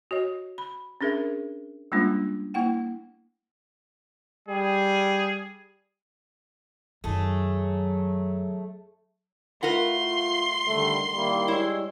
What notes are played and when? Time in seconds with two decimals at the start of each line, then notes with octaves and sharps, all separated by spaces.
0.11 F#4 C#5 D#5
0.58 B5
1.01 C#4 D4 G#4 A#4 E5
1.92 G3 G#3 A#3 C#4 D4 F4
2.54 A#3 E4 F#5 G5
4.49 G3 G#4
7.04 F#2 D#3 F#3 A3 G#4
9.63 A3 F4 A#4 B4 F#5 C6
9.99 F4
10.67 D3 D#3 G3 A3
11.14 D#3 G3 A#3 E4
11.48 G#3 E4 C#5